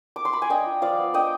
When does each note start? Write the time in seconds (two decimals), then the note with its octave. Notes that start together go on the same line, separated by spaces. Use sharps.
0.16 D6
0.25 C6
0.33 B5
0.42 G#5
0.49 D4 D#5 G5
0.66 F4
0.82 F3 D5 F5
0.98 B3
1.14 D4 D#5 G5